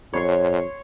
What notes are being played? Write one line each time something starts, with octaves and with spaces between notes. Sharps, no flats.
F2 C#5 C6 C#6